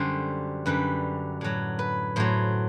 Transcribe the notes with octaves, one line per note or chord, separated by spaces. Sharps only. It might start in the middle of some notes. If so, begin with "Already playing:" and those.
Already playing: F#2 D3 G3 C5
F#2 D3 G3 B4
A2 F#3
B4
A2 F#3 C5